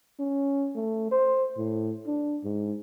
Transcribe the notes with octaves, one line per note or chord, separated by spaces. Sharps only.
C#4
A3
C5
A2
D4
G#2